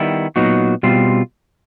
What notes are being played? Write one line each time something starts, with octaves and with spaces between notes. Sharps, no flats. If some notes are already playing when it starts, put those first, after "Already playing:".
Already playing: D#3 G3 B3 E4
A#2 F#3 B3 D#4 F#4
B2 G3 C4 F4